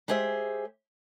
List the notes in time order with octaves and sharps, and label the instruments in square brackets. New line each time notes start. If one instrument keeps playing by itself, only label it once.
[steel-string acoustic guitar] G#3 G4 G#4 C5 E5